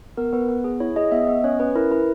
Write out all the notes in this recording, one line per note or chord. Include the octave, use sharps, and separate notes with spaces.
B3 A#4
B3 B4
B3
G#4
E4 C#5
G#4 D#5
B3 E5
B3 D#5
C#4 C#5
C#4 B4
E4 A#4
E4 B4